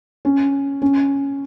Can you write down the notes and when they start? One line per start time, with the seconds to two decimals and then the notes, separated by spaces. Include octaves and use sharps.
0.25 C#4
0.82 C#4